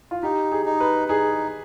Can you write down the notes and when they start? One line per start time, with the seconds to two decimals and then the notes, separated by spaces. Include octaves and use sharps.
0.11 F4
0.23 D#4 G4
0.52 G#4
0.66 D#4
0.80 B4
1.08 D#4 G#4